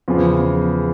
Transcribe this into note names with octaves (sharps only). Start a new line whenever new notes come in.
E2 C#3 F3